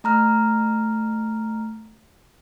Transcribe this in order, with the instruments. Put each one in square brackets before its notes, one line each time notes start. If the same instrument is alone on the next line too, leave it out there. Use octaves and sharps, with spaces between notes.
[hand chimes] A3 A#5 F6